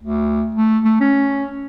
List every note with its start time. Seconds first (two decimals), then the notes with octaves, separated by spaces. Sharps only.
0.03 D2
0.55 A3
0.85 A3
1.00 C#4